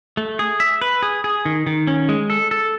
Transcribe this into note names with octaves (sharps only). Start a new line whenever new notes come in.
A3
G#4
E5
B4
G#4
G#4
D#3
D#3
C#4
G#3
A4
A4